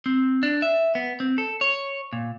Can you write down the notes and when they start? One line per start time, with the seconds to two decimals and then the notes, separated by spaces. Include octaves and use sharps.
0.06 C4
0.43 D4
0.62 E5
0.95 B3
1.20 C4
1.38 A4
1.61 C#5
2.13 A#2